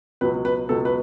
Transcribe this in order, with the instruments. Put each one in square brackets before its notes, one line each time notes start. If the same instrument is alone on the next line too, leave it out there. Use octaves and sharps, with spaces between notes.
[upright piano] C#2 B2 F#3 B4
B4
C#2 B2 F#3 A4
B4